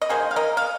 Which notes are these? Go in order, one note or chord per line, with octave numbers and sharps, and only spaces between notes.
D#5
D#3 A#3 G#4 C5
F5
A#4 D#5
F5